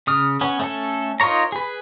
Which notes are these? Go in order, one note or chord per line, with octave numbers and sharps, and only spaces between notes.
C#3 D#6 F6
B3 C#4
A3 C#4 A4
D#4 F4 A#4 C#5 A#5
G#4 B4